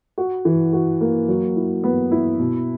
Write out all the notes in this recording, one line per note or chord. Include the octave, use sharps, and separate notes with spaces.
F#4
E3
F#4
A#3
F#3
E4
B3
E4
B2